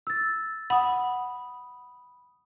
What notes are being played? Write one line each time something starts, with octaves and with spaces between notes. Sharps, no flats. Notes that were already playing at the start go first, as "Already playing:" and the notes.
E6 A6
F#5 B5 D#6